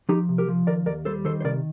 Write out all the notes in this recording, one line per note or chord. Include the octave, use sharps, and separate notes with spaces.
F3 D#4 G4
C3
G4 A#4
F3
D#3 A#4 D5
D#2 A#4 D5
G3 A4 C5
D#3 A4 C5
C5
C3 A#4 D5